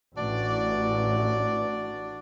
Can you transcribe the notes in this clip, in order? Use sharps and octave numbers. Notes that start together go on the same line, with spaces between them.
A1 D4 F#4 D5